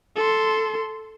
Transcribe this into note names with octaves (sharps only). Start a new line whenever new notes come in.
A4 C6